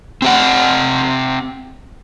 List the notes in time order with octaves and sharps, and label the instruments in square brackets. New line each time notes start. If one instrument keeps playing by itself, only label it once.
[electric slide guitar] C4 G4 F#5